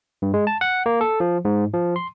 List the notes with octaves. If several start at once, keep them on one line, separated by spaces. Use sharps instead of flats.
G2
G#3
A5
F#5
A#3
A4
F3
G#2
F3
C6